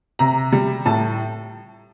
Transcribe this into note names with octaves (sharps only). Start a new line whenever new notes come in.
C3 A#5
G3
A2 A5